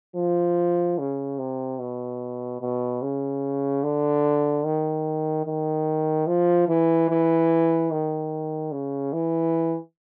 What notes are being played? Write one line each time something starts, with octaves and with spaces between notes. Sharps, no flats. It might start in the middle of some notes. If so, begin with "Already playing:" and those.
F3
C#3
C3
B2
B2
C#3
D3
D#3
D#3
F3
E3
E3
D#3
C#3
E3